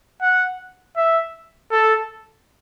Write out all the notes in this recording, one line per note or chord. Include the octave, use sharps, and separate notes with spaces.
F#5
E5
A4